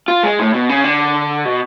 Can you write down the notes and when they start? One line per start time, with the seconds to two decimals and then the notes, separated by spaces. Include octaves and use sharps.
0.08 F4
0.23 G#3
0.39 A2
0.54 B2
0.69 C#3
0.84 D3
1.45 B2